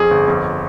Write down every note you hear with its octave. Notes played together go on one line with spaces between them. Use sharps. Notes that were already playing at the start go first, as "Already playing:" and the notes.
Already playing: F2 G#4
G1
F2